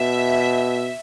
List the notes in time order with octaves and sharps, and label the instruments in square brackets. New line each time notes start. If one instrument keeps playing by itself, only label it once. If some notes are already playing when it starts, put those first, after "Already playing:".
Already playing: [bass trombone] B2 [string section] E5